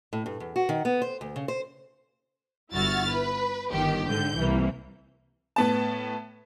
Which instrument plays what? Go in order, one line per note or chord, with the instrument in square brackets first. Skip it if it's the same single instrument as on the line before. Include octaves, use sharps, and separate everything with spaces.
[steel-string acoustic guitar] A2
G2
E2
F#4
D#3
B3
C5
D2
C#3
C5
[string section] G1 E4 F#4 F6 A6
B4
G1 D#3 G4
G#2 D3 G6
C2 E3 A#3
[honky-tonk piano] A2 B3 A5